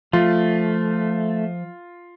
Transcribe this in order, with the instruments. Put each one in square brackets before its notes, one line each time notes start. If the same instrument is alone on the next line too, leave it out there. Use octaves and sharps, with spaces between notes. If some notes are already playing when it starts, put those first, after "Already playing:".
[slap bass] F3 [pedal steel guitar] A3 [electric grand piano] F4